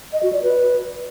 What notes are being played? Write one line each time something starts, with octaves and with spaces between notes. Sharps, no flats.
D#5
F#4
D5
B4